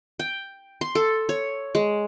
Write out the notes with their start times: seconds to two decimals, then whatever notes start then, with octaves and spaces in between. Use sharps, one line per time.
0.19 G5
0.81 C6
0.95 A4
1.29 C#5
1.75 G#3